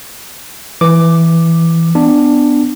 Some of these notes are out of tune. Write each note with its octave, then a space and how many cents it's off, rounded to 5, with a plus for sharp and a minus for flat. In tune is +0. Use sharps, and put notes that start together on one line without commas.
E3 +0 D6 +0
B3 +15 D4 +10